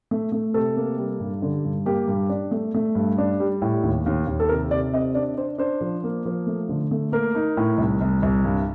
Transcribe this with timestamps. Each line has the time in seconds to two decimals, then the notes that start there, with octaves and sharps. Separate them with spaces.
0.11 A3
0.32 A3
0.54 C3 A4
0.77 A#3
0.98 G3
1.20 G2
1.42 D3
1.65 G2
1.86 A#3 G4
2.08 G2
2.30 D4
2.51 A3
2.74 A3
2.95 G2
3.18 D4
3.40 G3
3.62 A2
3.83 D#2
4.06 D#2
4.27 D#2
4.40 A4
4.49 C3 A#4
4.71 C3 D5
4.93 C4 D#5
5.15 D4 D5
5.37 D4 C5
5.58 D4 C5
5.81 F3
6.03 A#3
6.25 F3
6.47 A3
6.69 D3
6.91 A3
7.12 A#3 A#4
7.35 D#4
7.57 A2
7.78 C2
8.01 C2
8.22 C2
8.45 G2